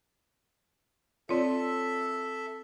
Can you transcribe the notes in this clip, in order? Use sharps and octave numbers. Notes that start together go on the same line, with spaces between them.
C4 F4 A4 C#5 D5 E5